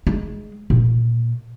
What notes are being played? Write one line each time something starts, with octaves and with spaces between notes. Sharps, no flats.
G#3
A#2